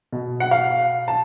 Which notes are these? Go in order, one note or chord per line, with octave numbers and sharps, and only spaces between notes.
B2
F#5
F5
A5